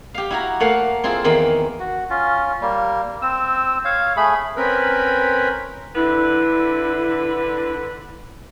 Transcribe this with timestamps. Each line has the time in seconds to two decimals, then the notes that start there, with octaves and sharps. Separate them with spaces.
0.14 G4 F5
0.30 E4 F#4 A#5
0.60 A3 A#3 C#5 F5 F#5
1.04 C4 E4 F4 G#4
1.24 E2 D#3 A#3 C4 B5
1.79 F#4
2.10 C#4 F4
2.61 G3 A#3
3.22 C4 E6
3.85 C#5 F5
4.17 A3 G#4 B5
4.57 C4 C#4 A#4 B4 B5
5.95 D3 E4 B4